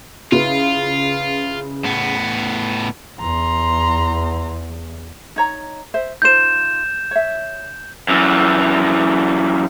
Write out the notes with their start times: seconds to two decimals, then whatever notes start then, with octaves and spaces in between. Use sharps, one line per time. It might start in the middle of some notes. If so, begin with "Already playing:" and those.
0.32 C#3 E4 F4 B4
1.85 A2 B3
3.20 E2 A#5 C6
5.36 D#4 C#5 A#5
5.94 C5 E5
6.22 D#4 F4 C5 G6 E7
7.11 C#5 E5
8.09 F#2 E3